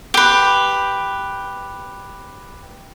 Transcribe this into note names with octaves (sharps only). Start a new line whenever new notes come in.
G4 B4